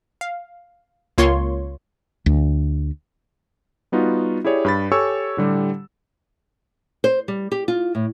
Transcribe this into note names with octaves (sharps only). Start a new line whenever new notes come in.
F5
C#2 A#3 F4 C#5 C6 C#6
D2
G3 B3 D#4 F4 F#4
E4 G4 G#4 C#5 D5
G2 B5 A6
G4 A4 C#5 G#5 C#6 E6
A2 D3 G3 G4
C5
G3
G4
F4
A2